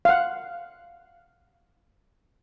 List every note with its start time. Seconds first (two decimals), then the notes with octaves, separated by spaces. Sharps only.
0.05 F5 F#5